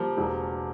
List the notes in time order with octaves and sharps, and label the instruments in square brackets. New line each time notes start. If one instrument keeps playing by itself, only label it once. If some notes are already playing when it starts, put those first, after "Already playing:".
Already playing: [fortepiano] F3 G3 [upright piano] A#3
[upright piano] E1